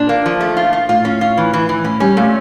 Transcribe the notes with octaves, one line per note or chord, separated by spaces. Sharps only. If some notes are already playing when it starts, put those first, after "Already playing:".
Already playing: A#2 D4
A#3
F3
A3
F4
F4
A2 F4
C#4
F4
E3
E3
E3
A2 C#4
G3 C#4
A#2 A3